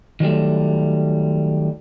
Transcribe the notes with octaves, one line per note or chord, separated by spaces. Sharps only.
D#3 F#3 G3 A3